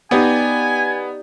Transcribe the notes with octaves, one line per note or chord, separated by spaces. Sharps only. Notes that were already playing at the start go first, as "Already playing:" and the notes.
B3 D#4 G4 D5 G#5